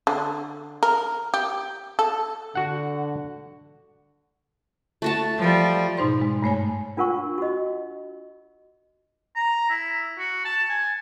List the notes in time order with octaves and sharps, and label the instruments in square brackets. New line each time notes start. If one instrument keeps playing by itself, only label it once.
[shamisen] D3
A#4
G4
A4
[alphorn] D3 [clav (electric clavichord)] F#4 F#5
[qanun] A3 F#4 A5
[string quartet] F3 G3
[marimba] G#2 B2 D#4 C5 C6
G#3
G2 A3 C#5 G#5
[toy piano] D4 F4 A#4 F#5 C#6
F#4 D#5
[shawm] A#5
E4
F#4
A5
G#5